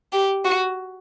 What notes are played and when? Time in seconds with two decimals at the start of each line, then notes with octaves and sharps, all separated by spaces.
0.13 G4
0.45 F#4